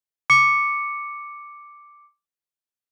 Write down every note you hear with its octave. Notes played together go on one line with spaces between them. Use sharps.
D6 C#7